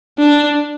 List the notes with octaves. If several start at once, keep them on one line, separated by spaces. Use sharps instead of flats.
D4